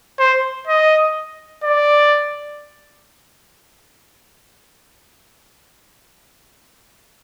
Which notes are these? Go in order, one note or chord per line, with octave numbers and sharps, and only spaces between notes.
C5
D#5
D5